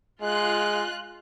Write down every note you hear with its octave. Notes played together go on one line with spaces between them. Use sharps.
G#3 F4 F#6